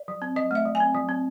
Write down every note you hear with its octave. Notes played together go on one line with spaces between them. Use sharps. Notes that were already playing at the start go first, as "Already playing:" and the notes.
Already playing: D5
F#3
C4
F#3 D#5
A3 E5
F#3
G#5
C4
F#3
C4